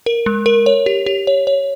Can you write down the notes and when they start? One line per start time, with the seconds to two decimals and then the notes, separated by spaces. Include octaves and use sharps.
0.06 A#4
0.26 G#3
0.46 A#4
0.66 C#5
0.86 G4
1.06 G4
1.27 C#5
1.47 C#5